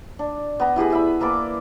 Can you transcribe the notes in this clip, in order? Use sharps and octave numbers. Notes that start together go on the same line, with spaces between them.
D4
B3 A#5
E4 G4 G#4 B4
G#4 E5 B5
A#3 B4 A5 D6